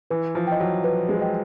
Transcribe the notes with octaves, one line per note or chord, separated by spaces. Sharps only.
E3 B4
F3
D#5 G5
F#3
B4
G#3
D#5 G5